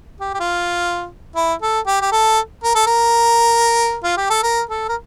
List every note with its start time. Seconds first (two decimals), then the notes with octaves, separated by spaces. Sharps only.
0.20 G4
0.34 G4
0.40 F4
1.36 E4
1.62 A4
1.87 G4
2.01 G4
2.12 A4
2.64 A#4
2.75 A4
2.87 A#4
4.04 F4
4.17 G4
4.30 A4
4.43 A#4
4.70 A4
4.89 A#4